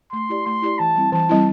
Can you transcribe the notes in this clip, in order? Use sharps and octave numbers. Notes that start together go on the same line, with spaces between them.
A3 C6
E4 G4 D5
A3 C6
E4 G4 D5
E3 A5
G3 C4 E4
E3 A5
G3 C4 E4